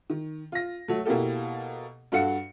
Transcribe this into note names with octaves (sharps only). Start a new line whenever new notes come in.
D#3
F4 A#6
F#3 A3
B2 A#3 E4 G4 A4
G2 F#4 A4 F5 F#5 C#7